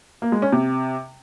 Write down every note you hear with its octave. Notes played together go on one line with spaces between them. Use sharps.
A#3
G#3
C#4
C3